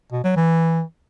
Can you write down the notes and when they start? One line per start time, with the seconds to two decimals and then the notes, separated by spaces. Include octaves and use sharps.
0.12 B2
0.24 F#3
0.36 E3